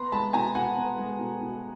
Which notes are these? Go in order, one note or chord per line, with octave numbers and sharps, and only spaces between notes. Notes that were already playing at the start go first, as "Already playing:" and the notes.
Already playing: B3 A#5 C6
G#3 A5 B5
B2 G#5 A#5
B2 F#5 G#5
B3
G#3
B2
B2